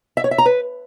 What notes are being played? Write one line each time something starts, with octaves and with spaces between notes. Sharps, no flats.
E5
C#5
E5
A#5
B4